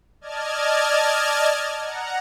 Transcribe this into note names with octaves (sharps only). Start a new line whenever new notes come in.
D5 D#5 A5 F6 G#6
F#5 A#5